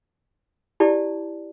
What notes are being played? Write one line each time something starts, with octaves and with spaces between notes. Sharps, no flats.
E4 G4 D5 A5